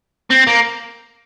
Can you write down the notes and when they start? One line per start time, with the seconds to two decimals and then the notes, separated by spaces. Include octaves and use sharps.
0.30 C4
0.47 A#3